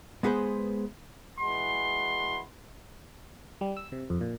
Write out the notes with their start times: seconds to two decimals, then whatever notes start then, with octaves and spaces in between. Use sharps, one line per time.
0.23 G#3 B3 G#4 B4 C5
1.39 E3 G#3 F#4 B5 C6
3.61 G3
3.77 E6
3.92 C3
4.10 F2
4.21 A#2